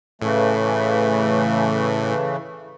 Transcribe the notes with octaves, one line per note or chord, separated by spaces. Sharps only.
A2 C#3 E3 A3